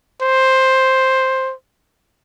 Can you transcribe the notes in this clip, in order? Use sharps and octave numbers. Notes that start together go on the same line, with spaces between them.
C5